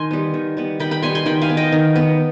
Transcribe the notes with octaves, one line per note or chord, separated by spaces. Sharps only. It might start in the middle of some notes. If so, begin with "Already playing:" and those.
Already playing: D#3 G#5 C6
G3 B3
D#3
G3 B3
D#3 G5 B5
G5 B5
G3 B3 G#5 C6
G#5 C6
D#3 G5 B5
F5 G#5
B3
D#5 G5
D#3
B3